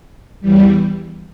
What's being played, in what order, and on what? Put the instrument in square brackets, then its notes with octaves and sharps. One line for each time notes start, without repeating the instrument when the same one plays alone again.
[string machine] E2 E3 G3